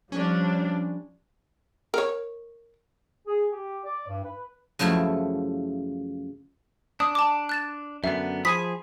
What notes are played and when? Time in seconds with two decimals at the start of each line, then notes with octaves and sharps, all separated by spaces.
0.12 F3 G3 C#4 D4
1.94 A#4 C#5
3.27 G#4
3.51 G4
3.84 D5
4.07 G2
4.23 B4
4.79 F#2 C#3 F3 A3 E4
7.00 D4 D#6
7.15 A5 D6
7.49 F#6 A6 E7
8.04 F#2 D3 B3 E5
8.45 F3 G#4 G#5 B5 D#6 B6